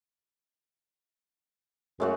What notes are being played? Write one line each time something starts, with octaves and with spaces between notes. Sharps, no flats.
F#2 G#3 A3 F#4